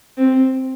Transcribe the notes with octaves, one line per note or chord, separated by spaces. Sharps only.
C4